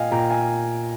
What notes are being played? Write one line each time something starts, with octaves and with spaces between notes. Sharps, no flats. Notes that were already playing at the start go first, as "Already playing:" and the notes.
Already playing: A#2 D#5 F5 G5 G#5
A#2 G5 A#5
F5 G#5